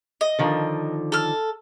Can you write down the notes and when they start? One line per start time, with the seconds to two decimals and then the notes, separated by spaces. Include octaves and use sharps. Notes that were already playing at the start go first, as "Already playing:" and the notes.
0.21 D#5
0.39 D3 D#3 F3
1.12 A4 F6